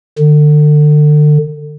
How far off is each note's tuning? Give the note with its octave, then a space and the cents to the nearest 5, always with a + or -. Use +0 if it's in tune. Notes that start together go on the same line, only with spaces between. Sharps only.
D3 +30